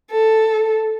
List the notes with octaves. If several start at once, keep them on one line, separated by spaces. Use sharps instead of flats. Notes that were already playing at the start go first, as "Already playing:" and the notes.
A4